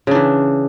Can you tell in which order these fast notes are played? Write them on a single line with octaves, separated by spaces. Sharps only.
C#3 D4 E3